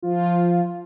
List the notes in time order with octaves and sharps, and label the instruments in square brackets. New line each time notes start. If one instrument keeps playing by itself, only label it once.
[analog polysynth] F3 F4